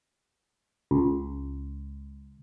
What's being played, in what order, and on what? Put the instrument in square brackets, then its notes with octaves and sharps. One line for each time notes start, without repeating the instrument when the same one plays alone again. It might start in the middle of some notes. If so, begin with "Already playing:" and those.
[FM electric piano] C#2